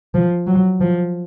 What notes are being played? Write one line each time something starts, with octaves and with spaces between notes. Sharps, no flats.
F3
F#3
F3